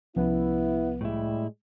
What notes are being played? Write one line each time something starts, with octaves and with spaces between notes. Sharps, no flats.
C2 F3 B3 C#4 E4
A2 G3 G#3 E4